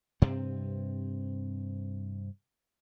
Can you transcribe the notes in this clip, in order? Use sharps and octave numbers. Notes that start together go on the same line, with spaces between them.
G2 C3 C4